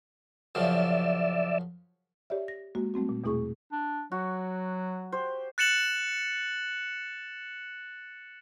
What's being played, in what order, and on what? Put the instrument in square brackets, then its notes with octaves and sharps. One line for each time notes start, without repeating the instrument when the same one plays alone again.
[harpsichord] F#2 C#3 F3 [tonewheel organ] D5 E5
[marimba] G4 C#5 D5 E5
A#6
G#3 A#3 F#4
G3 A3 C4 F#4
A#2
E2 B2 A3 E4 G#4 C#6
[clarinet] D4
[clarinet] F#3 [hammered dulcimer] F#4
[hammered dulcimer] G4 C5
[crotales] F#6 A6 C#7 E7 F#7